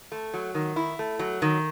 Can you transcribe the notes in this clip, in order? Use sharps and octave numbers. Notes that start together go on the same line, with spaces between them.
A3
F#3
D#3
E4
A3
F#3
D#3